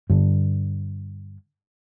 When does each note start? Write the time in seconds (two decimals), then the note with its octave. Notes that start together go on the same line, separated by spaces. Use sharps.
0.10 G2 D3